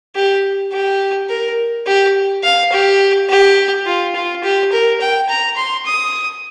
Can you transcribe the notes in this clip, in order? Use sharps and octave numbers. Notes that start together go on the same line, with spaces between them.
G4
G4
A#4
G4
F5
G4
G4
F4
F4
G4
A#4
G5
A#5
C6
D#6